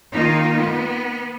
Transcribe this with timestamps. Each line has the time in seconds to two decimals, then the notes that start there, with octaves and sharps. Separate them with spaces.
0.14 D#3 A#3 D#4 F4
0.56 B3